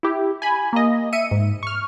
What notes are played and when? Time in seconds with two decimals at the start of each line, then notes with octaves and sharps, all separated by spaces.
0.03 E4 G4
0.42 G#5 B5
0.73 A#3 D#5
1.13 E5 C#7 D#7
1.31 G#2
1.63 C#6 F6